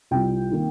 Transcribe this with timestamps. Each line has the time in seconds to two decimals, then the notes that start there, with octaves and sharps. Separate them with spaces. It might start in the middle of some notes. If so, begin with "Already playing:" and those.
0.11 C2 C3 G3 C4 F4 G5
0.51 C3 D#3 A#3